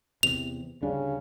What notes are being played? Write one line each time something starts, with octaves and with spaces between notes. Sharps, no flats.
E2 C3 F7
D2 C#3 G3 D4